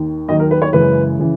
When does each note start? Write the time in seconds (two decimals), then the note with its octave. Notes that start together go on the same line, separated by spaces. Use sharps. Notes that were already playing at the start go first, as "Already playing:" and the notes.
Already playing: D#2 D#3
0.28 D#2 D#3 F#3 D#5
0.40 A#4
0.51 B4
0.62 C#5
0.73 F#2 C#3 E3 G#3 B4
1.19 C#3 E3